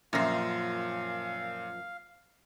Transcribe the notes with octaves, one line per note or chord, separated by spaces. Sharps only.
F#2 A#2 F3 F5 A#6